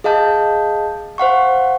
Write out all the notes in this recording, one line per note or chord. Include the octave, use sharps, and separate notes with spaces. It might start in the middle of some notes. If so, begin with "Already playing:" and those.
G#4 D#5 F5 A5 G6
C5 F5 F#5 C#6